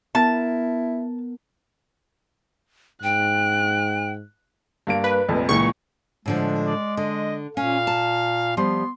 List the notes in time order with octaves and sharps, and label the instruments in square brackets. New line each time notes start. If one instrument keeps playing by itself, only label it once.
[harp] B3 A#4 [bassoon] E4 [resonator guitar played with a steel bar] A5
[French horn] G#2 [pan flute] G5 [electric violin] F#6
[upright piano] G2 A#3 D7
[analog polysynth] B4
[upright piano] F1 A#1 F2
[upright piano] C#2 A#2 E3 [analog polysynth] C#6
[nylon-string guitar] A2 D3 F3 [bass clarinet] G#3
[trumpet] D5
[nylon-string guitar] D3 [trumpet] D#5
[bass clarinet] A#2 [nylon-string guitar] C#4 [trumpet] F5
[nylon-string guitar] A5
[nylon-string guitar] F3 G3 [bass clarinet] B3 [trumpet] C6